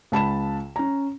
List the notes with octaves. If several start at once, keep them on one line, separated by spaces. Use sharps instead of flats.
C#2 A5 B5 E7
C#4 A#5